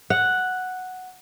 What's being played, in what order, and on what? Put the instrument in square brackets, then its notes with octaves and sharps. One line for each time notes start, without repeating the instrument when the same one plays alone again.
[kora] F#5